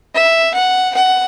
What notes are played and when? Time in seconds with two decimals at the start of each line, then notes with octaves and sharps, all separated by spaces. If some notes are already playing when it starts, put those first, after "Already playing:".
0.15 E5
0.54 F#5
0.94 F#5